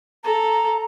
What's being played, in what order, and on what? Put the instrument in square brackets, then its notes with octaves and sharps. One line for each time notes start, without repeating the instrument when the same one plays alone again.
[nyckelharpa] A4 [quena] A#5